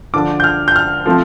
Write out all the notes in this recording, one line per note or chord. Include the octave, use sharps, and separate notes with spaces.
D3 F3 D4 D6
G6
F6
G6
F6
F3 A3 C4